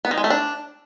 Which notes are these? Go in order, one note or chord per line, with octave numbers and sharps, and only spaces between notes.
B3
D#3
G#3
A3
D4